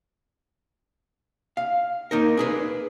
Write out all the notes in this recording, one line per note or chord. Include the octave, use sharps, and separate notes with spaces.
F5
A#3 D#4 A#4
D4 G#4 B4